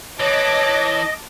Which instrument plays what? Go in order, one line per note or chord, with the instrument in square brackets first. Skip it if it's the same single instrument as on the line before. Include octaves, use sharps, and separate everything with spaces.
[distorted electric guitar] E3 [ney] C#5 [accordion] D#5 [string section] A5 D6